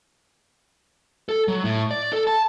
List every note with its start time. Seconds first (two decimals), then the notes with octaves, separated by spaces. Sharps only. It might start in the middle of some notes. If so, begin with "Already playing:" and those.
1.29 A4
1.48 F#3
1.64 A2
1.91 D5
2.13 A4
2.27 A5